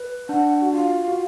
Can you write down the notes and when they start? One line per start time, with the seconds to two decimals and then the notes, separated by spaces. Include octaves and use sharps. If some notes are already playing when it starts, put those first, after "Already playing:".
Already playing: B4
0.29 D4 F#5
0.62 F#4
0.74 F4 F5
1.08 F#4